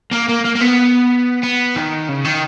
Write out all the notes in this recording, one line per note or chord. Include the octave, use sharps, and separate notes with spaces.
A#3
A#3
A#3
A#3
B3
B3
D#3
C#3
D#3